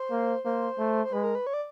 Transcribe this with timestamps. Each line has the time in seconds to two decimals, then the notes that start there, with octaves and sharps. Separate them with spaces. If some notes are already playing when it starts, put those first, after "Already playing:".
Already playing: C5
0.11 A#3
0.44 A#3 C5
0.78 A3
1.05 C5
1.12 G#3 B4
1.24 A#4
1.35 B4
1.47 C#5
1.54 D5